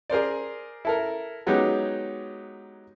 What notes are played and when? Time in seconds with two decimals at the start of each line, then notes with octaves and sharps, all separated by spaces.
0.10 G#4 A#4 C5 D5
0.85 E4 A4 A#4
1.47 F#3 G#3 B3 C#4 D#4 G4